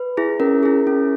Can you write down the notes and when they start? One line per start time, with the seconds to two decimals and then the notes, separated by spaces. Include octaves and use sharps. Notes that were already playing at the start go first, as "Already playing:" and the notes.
Already playing: B4
0.17 E4 G#4
0.40 C#4 A#4
0.63 E4 G#4
0.87 C#4